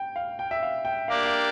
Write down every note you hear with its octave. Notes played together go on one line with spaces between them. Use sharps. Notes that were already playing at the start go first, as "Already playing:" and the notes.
Already playing: G5
F5
G5
E5
F5
G5
A#3 D4 G4 A#4 D5 F5
F5